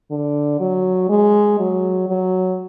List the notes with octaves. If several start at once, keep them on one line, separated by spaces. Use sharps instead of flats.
D3
F#3
G#3
F#3
F#3